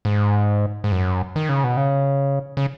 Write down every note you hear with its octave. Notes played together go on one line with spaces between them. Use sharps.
G#2
G#2
F#2
D#3
C#3
B2
C#3
C#3